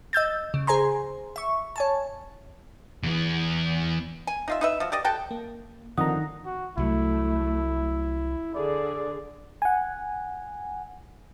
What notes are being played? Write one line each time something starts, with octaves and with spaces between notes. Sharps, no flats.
D#5 E6 G6 A6
C#3
G#4 C5 G#5 A#5 C6
E5 C#6
C#5 G#5 A5
E2 E3
G#5
D#4 F4 E5
D#4 B4 E5
F3 F#4
G4 D5 D#5
F#4 A4 G5 A5
A#3
D3 D#3 F3 C4 F#5 A#5 D#6
F#4
C2 F#3 A3 E4
D3 G#4 D5
F#5 G#5